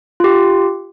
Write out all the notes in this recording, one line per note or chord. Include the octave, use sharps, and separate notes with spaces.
F4 G4